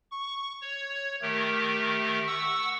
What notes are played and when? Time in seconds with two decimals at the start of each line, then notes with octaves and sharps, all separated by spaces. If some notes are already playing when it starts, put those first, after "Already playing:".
0.11 C#6
0.62 C#5
1.22 D#3 A3 G4 A#4
2.27 F#5 C#6 E6